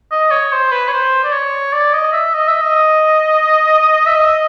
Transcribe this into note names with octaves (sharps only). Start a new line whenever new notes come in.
D#5
C#5
C5
B4
C#5
C5
D5
C#5
D5
D#5
E5
D#5
E5
D#5
E5
D#5